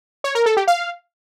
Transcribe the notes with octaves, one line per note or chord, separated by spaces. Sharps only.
C#5
A#4
A4
G4
F5